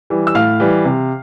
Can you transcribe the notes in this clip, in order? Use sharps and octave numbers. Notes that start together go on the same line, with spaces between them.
E3 G3
E6
A2 F5 F6
E3 G3
C3